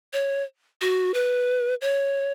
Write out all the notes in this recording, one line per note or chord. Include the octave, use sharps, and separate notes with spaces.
C#5
F#4
B4
C#5